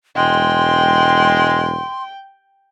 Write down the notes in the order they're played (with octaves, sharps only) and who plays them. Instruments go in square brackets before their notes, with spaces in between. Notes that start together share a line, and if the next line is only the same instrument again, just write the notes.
[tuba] E1 [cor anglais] G#3 [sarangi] G5 [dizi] C6